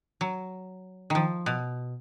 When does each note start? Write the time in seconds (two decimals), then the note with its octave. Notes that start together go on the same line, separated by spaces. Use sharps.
0.21 F#3
1.10 D#3 F3
1.46 B2